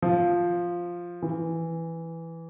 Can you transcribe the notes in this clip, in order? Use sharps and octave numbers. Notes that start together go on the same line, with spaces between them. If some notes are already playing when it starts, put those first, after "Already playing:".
F3
E3